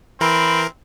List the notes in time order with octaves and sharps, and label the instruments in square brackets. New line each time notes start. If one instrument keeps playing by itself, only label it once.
[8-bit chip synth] E3 A#4 [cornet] C4 [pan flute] B5